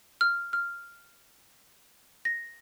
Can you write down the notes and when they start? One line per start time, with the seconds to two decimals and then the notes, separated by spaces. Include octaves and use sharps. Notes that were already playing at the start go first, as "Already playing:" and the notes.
0.21 F6
0.53 F6
2.25 A#6